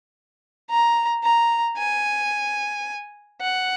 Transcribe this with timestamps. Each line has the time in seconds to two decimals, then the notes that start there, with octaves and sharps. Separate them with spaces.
0.70 A#5
1.24 A#5
1.78 G#5
3.41 F#5